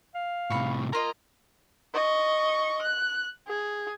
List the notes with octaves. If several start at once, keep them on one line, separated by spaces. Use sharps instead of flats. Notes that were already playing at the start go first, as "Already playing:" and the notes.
F5
A2 C3 B5 C#6
A#3 F4 D#5 A#5
D#5 C#6
F#6
G#4